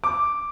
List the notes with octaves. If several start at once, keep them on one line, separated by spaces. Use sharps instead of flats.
D6